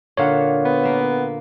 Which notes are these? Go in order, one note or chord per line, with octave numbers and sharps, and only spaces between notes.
A#2 D3 D#4 C#5 F5 F#5
B3
A#3 E5